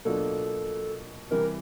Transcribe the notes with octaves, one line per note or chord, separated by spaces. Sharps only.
B2 F#3 A#3 D4 F4 A4
C3 E3 G3 A#4